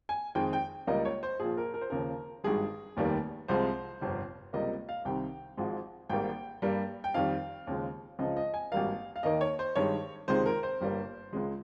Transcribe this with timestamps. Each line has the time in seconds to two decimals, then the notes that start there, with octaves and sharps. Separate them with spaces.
0.09 G#5
0.35 F2 D#3 G#3 G5
0.53 G5
0.87 C#2 C#3 G3 A#3 D#5
1.05 C#5
1.23 C5
1.40 A#1 A#2 F3 G#4
1.57 A#4
1.74 A#4
1.81 C5
1.90 D#2 C#3 F3 A#4
2.44 G#1 G2 D#3 G#3 G#4
2.97 F1 D#2 D#3 G3 A#3
3.48 C2 C3 F3 G#3 C5
4.01 G1 F2 C3 G3
4.53 C#2 C3 G3 A#3 D#5
4.89 F5
5.05 C2 C3 D#3 G5
5.57 G#1 G#2 F3 G#3
6.09 G#1 G#2 G3 A#3 G5
6.62 G2 G3 A#3
7.04 G5
7.14 F2 D#3 G3 F5
7.67 D#2 C#3 F3 G#3
8.19 C#2 C#3 F3 D#5
8.37 D#5
8.54 G#5
8.72 G#1 G2 G3 A#3 F5
9.16 F5
9.23 D#2 D#3 A#3 D#5
9.41 C#5
9.59 C5
9.75 G2 D#3 G#3 C#5
10.28 C#2 C3 D#3 G#3 C5
10.46 A#4
10.63 C5
10.81 G1 G2 G3 A#3
11.33 C#2 C#3 G#3